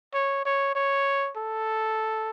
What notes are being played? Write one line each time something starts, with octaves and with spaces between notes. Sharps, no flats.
C#5
C#5
C#5
A4